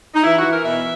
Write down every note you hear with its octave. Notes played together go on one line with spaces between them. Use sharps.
D#4
E3 E4
F#4
E3
A#4
B2 E5